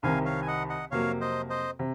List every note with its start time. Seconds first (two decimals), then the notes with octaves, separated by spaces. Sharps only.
0.03 C2 C3 D#3 F5 G#5
0.25 C#5 F5
0.42 G#5
0.48 D#5 F#5
0.70 D#5 F#5
0.91 F2 C3 F#3 A#3 C#5 F5
1.21 C5 D#5
1.50 C5 D#5
1.79 C3